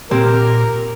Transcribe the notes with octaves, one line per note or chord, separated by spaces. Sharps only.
A#2 A#3 C4 G4 A#4